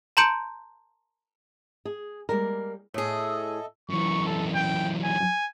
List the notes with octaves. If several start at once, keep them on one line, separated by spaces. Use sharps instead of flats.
A5 A#5 C6 G6 C#7 D7
G#4
G3 G#3 A#3 A#4
A2 G#4 A4 D#5 E5
F#2 E3 C#6
A4
G5
G#5